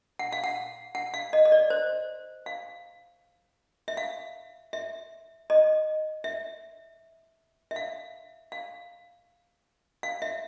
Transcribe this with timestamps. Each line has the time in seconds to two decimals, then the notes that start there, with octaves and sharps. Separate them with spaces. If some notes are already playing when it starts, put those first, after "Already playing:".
0.19 F#5
0.32 F5
0.44 F#5
0.95 F#5
1.14 F5
1.33 D#5
1.45 D#5
1.52 D5
1.70 C5
2.46 F5
3.88 E5
3.97 F5
4.73 E5
5.50 D#5
6.24 E5
7.71 E5
7.76 F5
8.52 F5
10.03 F5
10.22 E5